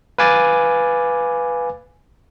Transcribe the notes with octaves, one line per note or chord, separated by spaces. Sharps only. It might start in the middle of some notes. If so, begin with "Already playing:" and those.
B4 F5 G#5 D6 A6